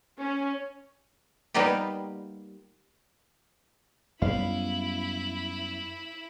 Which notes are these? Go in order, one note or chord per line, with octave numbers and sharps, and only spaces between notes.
C#4
G3 A#3 B3 D#4 F4 G4
F#2 G3 B3 E4 F5 B5